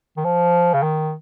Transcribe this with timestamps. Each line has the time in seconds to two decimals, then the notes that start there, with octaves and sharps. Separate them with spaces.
0.17 D#3
0.24 F3
0.74 C#3
0.82 D#3